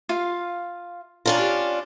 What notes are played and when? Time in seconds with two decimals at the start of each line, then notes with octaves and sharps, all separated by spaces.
0.09 F4 F5
1.26 C#4 D4 F4 A#5
1.38 G4